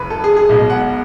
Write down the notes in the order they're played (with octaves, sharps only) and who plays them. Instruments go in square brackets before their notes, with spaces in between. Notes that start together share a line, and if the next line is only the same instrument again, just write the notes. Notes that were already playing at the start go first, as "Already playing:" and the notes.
Already playing: [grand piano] F#1 F#2 B4
A4
G#4
G#4
B1 B2 G#3
F#5